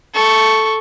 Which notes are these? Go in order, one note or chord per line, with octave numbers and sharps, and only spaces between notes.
A4 C#6